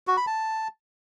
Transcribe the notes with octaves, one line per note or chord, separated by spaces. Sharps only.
F#4
B5
A5